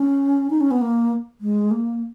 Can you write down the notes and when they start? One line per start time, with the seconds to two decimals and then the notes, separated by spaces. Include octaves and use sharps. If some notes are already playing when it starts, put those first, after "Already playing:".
Already playing: C#4
0.50 D#4
0.61 C#4
0.71 B3
0.81 A#3
1.41 G#3
1.71 A#3